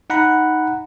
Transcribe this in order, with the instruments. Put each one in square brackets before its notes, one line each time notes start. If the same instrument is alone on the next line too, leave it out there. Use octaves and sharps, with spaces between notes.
[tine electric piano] D#4 F#5 A#5 B5